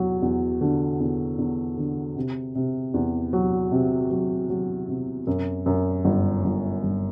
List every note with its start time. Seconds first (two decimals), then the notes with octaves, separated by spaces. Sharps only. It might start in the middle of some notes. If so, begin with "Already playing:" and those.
Already playing: E2 F#3
0.22 E2
0.61 D3
1.00 E2
1.39 E2
1.77 D3
2.16 C3
2.55 C3
2.94 E2
3.33 F#3
3.72 C3
4.11 F#3
4.49 F#3
4.88 C3
5.27 F#2
5.66 F#2
6.05 G1
6.44 G1
6.83 G1